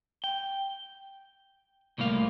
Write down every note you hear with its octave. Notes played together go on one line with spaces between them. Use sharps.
G5
C2 A2 A#3 F5